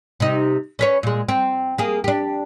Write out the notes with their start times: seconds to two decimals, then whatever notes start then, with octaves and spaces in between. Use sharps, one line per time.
0.20 C3 D#4
0.79 C#4 B4 C#5
1.03 A#2 G#3
1.28 C4
1.78 A#3 G#4
2.04 D4 G4